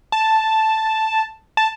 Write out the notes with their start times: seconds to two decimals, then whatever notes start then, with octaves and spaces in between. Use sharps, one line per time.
0.12 A5
1.57 A5